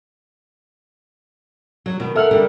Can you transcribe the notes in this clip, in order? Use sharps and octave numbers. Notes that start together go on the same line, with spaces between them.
F#3
B2 D#3
A4 A#4 E5 F#5 F6
D3 G3 A#4